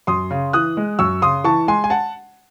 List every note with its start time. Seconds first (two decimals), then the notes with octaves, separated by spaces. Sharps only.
0.07 F#2 C6 D#6
0.31 C#3
0.53 E3 D#6 F#6
0.77 G#3
0.99 F#2 C#6 E6
1.22 C#3 C6 D#6
1.44 E3 A5 C#6
1.68 G#3 G#5 C6
1.84 G#5
1.90 F#5 A5